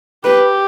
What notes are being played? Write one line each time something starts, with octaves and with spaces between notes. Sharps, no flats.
G4 B4